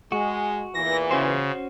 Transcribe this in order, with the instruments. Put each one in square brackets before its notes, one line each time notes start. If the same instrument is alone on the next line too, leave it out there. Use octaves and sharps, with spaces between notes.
[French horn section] G#3 [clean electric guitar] F#4
[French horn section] E2 A#2 E3 [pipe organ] A#6
[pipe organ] C#3 [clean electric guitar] C#4 F#4 C5